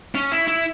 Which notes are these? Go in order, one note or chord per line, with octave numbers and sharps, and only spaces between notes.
C#4
E4
E4